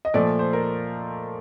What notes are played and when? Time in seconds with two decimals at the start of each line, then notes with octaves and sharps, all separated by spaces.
0.05 D#5
0.14 A#2 F3 A3 D5
0.39 C5
0.53 A#4